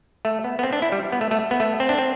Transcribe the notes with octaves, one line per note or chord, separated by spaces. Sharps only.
A3
B3
B3
C4
D4
E4
G3
B3
A3
A3
B3
A3
C4
D4
C4